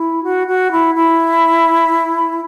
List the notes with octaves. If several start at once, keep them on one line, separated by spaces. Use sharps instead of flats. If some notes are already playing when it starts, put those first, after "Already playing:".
Already playing: E4
F#4
F#4
E4
E4